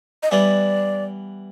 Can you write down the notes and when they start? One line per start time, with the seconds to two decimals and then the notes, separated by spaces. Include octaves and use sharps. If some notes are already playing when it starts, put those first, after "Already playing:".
0.23 D#5
0.31 E3 G3 B3 D5